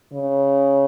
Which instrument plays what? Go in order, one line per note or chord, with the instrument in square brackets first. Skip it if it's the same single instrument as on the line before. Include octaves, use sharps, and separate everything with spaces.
[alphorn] C#3